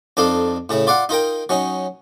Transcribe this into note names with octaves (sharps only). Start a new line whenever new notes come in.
F2 D4 D#4 A4 F5
A2 C#3 E4
F4 D5 F5 F#5
D#4 F4 A#4 G5
F#3 C#4 D#4